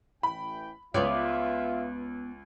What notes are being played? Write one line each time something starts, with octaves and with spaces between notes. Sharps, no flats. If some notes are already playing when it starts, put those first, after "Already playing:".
A1 E3 G5 B5
C#2 B3 F4 C#5 D5 E5